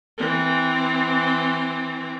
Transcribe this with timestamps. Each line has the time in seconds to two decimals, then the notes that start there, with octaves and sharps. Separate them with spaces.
0.18 E3 C4